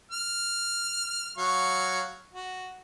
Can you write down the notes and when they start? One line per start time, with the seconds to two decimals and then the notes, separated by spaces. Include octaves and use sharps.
0.12 F6
1.38 F#3 F5 C#6
2.33 F#4